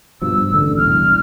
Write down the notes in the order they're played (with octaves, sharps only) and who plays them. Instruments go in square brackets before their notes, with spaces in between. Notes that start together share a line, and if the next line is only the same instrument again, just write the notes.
[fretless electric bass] G2 B2 F3 [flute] E6
[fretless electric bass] A1 D3
[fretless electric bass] E1 C2 G3 [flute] F6